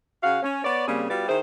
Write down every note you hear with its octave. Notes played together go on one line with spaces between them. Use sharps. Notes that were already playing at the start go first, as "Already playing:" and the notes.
C#3 F#4 F5
C#4
B3 C#5 D5
C#3 G3 A#3 C4 G#4
G3 B3 F4 F#4 D5
D#3 E4 G#4 C5